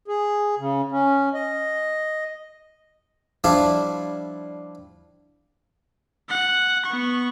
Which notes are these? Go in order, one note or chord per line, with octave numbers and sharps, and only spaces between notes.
G#4
C#3
C#4
D#5
F3 G3 D4 E4 F4
F#5
B3 C#6